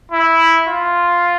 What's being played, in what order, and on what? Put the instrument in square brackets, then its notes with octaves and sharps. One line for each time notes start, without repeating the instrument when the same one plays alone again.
[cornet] E4
F4